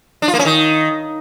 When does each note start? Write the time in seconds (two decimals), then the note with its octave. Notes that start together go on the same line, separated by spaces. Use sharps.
0.22 D4
0.28 F4
0.34 A#3
0.39 C#4
0.45 D#3